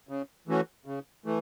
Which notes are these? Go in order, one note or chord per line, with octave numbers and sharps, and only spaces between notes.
C#3
E3 A3 C#4 F#4
C#3
E3 A3